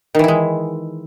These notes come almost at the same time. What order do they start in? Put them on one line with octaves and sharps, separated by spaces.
D#3 E3 E4 G#3